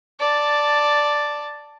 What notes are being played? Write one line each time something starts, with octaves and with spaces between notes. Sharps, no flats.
D5 A5